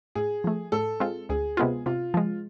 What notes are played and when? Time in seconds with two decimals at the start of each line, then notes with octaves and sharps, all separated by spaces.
0.15 A2 G#4
0.44 F3 A3
0.72 A2 A4
1.00 G#3 C4 F4
1.29 D2 G#4
1.57 C3 G#3 B3 F4
1.86 C3 F4
2.14 F3 G#3